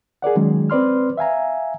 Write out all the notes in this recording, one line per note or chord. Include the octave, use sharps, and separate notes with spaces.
G#4 A#4 D5 F#5
D#3 F#3 G#3 C#4
C4 B4 D5 C6 F6
E5 F5 G#5 A#5